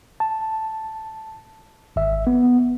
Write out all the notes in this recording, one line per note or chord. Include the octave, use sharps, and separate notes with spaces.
A5
G#1 E5
B3